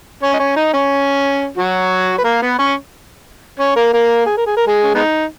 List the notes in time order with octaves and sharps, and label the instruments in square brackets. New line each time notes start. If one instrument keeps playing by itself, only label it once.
[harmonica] C#4 C#5
D#5
C#4 C#5
D#4 D#5
C#4 C#5
F#3 F#4
B4
A#3 A#4
B3 B4
C#4 C#5
C#4 C#5
A#3 A#4
A#3 A#4
G#4
A#4
G#4
A#4
G#3 G#4
C#4
G#3 B3 D#4